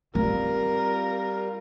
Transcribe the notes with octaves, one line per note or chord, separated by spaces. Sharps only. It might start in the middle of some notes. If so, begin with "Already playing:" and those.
G3 C4 F4 A#4